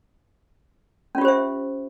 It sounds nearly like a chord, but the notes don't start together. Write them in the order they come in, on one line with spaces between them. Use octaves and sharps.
C#4 F4 G4 C5 E5